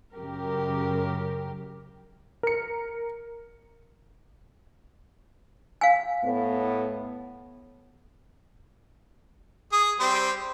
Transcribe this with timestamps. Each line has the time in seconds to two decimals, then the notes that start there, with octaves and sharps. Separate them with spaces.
0.13 F#2 C#3 G4 A#4
2.43 A#4 C#7
5.81 F5 G#5
6.23 A2 B3
9.72 G#4 D#6
10.00 G3 C4 C5